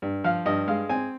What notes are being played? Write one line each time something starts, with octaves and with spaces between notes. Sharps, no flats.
G2
F3 F5
G2 D#5
G#3 F5
C4 G#5